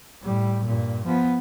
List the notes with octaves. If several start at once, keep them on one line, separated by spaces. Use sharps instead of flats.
A2 G3
G2 A#2
F3 B3